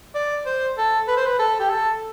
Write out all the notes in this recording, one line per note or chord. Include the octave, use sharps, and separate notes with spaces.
D5
C5
A4
B4
C5
B4
A4
G4
A4